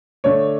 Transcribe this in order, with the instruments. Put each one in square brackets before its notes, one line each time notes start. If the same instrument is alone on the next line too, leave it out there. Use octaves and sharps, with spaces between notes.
[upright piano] D3 A3 D4 C#5